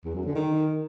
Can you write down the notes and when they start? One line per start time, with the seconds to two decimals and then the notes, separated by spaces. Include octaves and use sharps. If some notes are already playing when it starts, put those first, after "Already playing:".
0.05 E2
0.15 F#2
0.25 D3
0.36 D#3